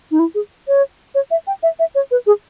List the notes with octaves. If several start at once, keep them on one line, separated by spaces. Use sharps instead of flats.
D#4
E4
G#4
C#5
C#5
E5
G5
E5
E5
C#5
B4
G#4